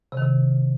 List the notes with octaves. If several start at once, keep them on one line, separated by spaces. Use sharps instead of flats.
C3
D#3
C3